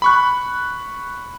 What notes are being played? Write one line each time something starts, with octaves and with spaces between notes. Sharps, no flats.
B5 C#6 F#6